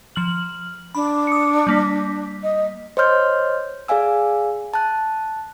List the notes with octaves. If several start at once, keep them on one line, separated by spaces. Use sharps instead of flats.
F3 F6 F#7
D4 B5
D#6 C#7
G3 A#3 B6
D#5
C5 C#5 D#5 C6 F6 G6
G#4 D5 F5 G#5 E6
A5 F#6